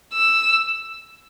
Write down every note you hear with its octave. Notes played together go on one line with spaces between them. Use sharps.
E6